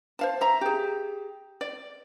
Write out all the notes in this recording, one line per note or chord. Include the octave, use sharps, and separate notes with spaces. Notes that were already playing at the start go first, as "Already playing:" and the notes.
C5 F5 A5
E5 A#5
G4 G#4
D5